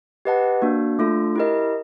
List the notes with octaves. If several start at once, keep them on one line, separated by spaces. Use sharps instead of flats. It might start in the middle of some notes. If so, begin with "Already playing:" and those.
G4 B4 D#5 F#5 A5
A#3 D4 F#4
A3 D4 F4 A4
E4 G4 A#4 D#5